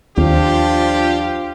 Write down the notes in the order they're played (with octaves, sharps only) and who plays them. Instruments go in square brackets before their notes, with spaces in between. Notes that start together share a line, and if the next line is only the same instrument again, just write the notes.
[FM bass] D#2 [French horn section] F3 D4 [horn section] F4 G4